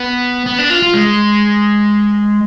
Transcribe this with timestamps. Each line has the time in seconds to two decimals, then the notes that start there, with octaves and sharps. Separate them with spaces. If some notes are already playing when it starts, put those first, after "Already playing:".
Already playing: B3
0.46 B3
0.59 D4
0.70 F4
0.82 F4
0.94 G#3